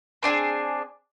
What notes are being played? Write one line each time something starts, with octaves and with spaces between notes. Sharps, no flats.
C4 D4 G#4